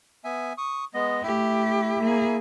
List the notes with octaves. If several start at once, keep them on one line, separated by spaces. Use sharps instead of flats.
B3 E5 G#5
C#6 D#6
G#3 B3 D#5
A3 E4 G4 E5
A#3 G#4